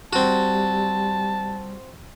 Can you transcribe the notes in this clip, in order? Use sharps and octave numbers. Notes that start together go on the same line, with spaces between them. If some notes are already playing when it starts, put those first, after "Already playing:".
G3 C4 F#4 A5